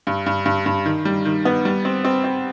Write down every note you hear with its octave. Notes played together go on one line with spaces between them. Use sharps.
G2
G2
G2
G2
D#3
G3
D#3
B3
G3
C4
C4
C4